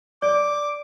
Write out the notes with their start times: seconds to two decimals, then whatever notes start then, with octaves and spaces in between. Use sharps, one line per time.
0.22 D5 D6